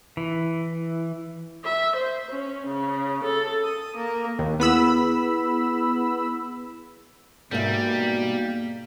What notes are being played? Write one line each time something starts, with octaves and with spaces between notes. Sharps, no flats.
E3
E5
C5
C#4
C#3
A4
D#6
A#3
D#2
B3 E4 G#4 B4 B5 E6
G#2 B2 G3 A#3 A#4 E5